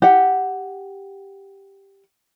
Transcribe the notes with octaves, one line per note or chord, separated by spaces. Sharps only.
G4 F#5